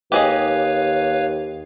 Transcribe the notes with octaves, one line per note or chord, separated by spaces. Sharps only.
D#2 G4 G#4 B4 C#5 D#5 F5